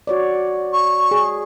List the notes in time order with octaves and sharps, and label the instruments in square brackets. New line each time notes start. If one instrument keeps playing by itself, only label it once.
[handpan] F#4 C#5 D5
[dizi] C#6
[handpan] G#4